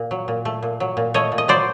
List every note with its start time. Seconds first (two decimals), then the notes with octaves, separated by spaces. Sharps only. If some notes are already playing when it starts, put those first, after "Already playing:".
Already playing: A#2
0.11 F#3
0.28 A#2
0.45 A3
0.62 A#2
0.80 F#3
0.97 A#2
1.14 A3 C#5 D#5
1.32 A#2
1.38 D#5
1.48 F#3 C5 D5